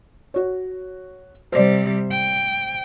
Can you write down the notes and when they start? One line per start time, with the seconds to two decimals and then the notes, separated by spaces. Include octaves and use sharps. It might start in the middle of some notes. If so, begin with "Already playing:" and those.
0.34 F#4 C#5
1.52 C3 G3 C5 D5
2.10 G5